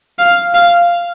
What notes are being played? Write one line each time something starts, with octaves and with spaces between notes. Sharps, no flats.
F5
F5